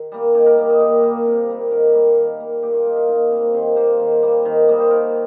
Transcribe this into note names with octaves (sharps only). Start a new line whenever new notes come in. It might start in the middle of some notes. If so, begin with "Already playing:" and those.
Already playing: D#3 G4
G3 A#3
D#3 G4
A#4
G3 A#3
D#5
A#2 G4
G3 A#3
C3
G3 A#3
D#3 A#4
G3 A#3
D#3
A#3
A#2 G4
F4
A#3 D#4
F4
A#2 D#4
G3 C4
A#3
D#3 C4
A#3 C5
D#3 C5
G3 A#3
D#3
G3 A#3 D#5
C5
D#3 A#4